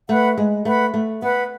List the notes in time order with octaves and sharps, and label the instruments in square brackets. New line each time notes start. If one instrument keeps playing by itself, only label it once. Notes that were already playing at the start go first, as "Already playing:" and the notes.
[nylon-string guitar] A3 [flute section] B4 F#5 B5
[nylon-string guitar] G#3
[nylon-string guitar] A3 [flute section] B4 F#5 B5
[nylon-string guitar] A3
[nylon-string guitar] B3 [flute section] B4 F#5 B5